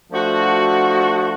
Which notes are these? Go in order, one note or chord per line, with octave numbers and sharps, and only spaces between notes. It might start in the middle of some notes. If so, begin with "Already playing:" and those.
F3 A3 D4 F#4